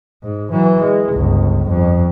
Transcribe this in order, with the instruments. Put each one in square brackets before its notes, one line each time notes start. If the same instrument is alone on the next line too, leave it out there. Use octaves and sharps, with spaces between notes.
[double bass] G#2
E3 F#3
G#3
G1 C#2
F2